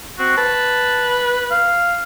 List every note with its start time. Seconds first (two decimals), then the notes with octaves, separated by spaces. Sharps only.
0.19 C4 F#4
0.37 B4 A5
1.51 F5